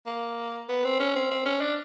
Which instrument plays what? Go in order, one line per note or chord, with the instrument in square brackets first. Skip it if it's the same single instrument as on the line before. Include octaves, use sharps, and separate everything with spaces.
[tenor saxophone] A#3
B3
C4
C#4
C4
C4
C#4
D4